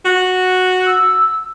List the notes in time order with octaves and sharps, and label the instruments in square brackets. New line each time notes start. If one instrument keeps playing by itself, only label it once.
[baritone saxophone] F#4
[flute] E6